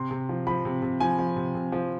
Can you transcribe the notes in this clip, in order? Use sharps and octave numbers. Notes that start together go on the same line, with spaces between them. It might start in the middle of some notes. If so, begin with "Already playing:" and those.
Already playing: C3 C6
C3
F3
F3 B5
C3
C3
F3 G#5
F3
C3
C3
F3